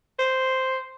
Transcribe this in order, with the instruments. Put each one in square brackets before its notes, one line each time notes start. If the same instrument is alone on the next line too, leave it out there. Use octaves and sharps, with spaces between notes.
[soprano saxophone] C5